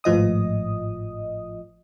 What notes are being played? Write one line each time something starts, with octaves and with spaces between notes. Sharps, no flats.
G#1 A2 F3 D#5 D#6